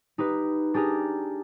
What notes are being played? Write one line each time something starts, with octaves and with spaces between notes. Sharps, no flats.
D#4 G4 B4
D4 G4 G#4 A#4